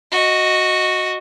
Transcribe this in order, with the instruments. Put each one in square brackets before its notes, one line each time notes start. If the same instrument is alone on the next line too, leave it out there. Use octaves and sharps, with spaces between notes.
[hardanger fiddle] F#4 D#5